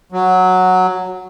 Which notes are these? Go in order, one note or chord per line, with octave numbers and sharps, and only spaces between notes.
F#3